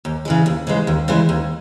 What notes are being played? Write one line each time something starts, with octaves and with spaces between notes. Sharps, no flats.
D#2
C#3 E3 G#3
D#2
C#3 E3 G#3
D#2
C#3 E3 G#3
D#2